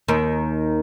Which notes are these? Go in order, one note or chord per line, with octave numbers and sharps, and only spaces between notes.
D#2 D#3